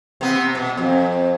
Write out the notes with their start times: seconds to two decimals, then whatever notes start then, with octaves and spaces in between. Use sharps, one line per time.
0.21 C3 B3
0.55 B2
0.77 F2